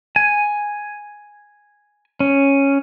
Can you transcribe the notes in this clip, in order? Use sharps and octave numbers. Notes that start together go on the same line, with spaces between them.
G#5
C#4